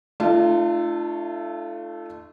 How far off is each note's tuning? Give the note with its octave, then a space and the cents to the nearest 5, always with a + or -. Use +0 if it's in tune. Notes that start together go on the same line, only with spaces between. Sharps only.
A3 +0 D4 +45 F4 -25